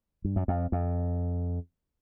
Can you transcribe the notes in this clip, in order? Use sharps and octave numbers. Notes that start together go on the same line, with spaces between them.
G2
F#2
F2
F2